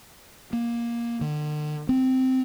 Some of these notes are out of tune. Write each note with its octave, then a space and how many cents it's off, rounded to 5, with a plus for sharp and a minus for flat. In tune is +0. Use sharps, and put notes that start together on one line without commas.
A#3 +15
D3 +40
C4 -10